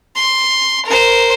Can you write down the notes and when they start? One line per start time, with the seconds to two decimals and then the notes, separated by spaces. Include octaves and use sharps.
0.16 C6
0.86 A#4 C5